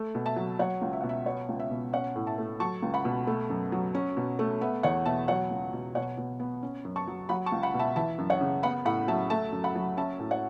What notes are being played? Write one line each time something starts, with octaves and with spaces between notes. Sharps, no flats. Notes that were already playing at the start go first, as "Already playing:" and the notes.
Already playing: A3
B2
E5 A5
F#3
F#3 C#5 F#5
C#2
E5
B2 F#5
E5
B3 C#5
C#2
E5
B2
C#4 C#5 F#5
A2
E5 A5
A3
F#3 A5 C#6
C#2
F#5 B5
B2
A3
F#2
F#3
C#4
B2
A3
B3 E5
E2 C#5 F#5
B2 E5 A5
F#3 C#5 F#5
C#2
B2
B2 C#5 F#5
B2
B3
C#4
F#2
A5 C#6
F#3
F#3 F#5 B5
A5 C#6
C#2
F#5 B5
B2
E5 A5
E3 E5 A5
F#2
C#5 F#5
C#3
B3 F#5 B5
A2 F#5 B5
F#3 E5 A5
A3 E5 A5
F#2
F#5 B5
F#3
C#4 E5 A5
A2
C#5 F#5